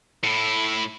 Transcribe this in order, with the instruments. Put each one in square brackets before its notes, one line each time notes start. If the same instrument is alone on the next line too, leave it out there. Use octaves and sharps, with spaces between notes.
[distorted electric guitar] A2 E4